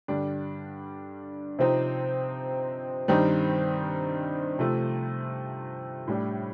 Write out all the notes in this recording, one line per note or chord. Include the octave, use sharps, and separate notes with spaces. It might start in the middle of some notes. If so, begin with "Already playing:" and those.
G2 D3 G3 D4
C3 F3 C4 D#4
G2 D#3 G3 C4 D#4
C3 F3 A3
A2 G3 D4